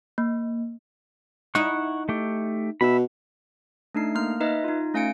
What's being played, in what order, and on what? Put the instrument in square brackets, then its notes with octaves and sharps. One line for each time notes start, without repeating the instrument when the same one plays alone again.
[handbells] A#3
[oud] D#4 E4 [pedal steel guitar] F#5 C#6
[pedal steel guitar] A3 G4
[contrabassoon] B2 [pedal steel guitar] E5 B5
[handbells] A3 D4 D#4 C7
A#3 A#5 F6
D#4 B4 D#5 E5
D#4 F4
A3 C#4 F5 G#5 C#7 D7